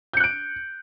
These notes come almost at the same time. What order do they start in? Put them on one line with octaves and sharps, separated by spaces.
G6 C#7 F#6 D7